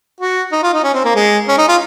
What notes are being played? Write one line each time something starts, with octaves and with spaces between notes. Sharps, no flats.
F#4
D#4
F4
D#4
C#4
C4
A#3
G#3
C#4
D#4
F4